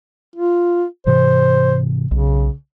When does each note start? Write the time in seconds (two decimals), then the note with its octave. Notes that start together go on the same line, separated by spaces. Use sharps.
0.36 F4
1.06 G#2 C3 E3 C5
2.11 B1 C#3